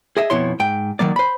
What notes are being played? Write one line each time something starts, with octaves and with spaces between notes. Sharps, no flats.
G#4 D#5 E5
F2 B2 E4 C#5 C6
G#2 G5
D#3 F#3 A#3 D5
C5 B5